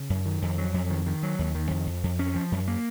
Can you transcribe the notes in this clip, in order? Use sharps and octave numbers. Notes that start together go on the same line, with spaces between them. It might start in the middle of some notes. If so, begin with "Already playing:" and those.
Already playing: C#3
F#2
D#3
F2
F#3
F2
D#3
D#3
F#3
D#2
D#3
F2
F2
F2
C#4
F3
F#2
A#3